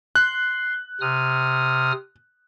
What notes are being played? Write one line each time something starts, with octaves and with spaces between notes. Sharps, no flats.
C6 F#6
C3 D#6 F6